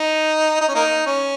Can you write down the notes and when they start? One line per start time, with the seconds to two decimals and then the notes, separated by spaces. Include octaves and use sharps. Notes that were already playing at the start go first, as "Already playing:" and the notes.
Already playing: D#4
0.61 D#4
0.69 C#4
0.75 A#3 D#4
1.06 C#4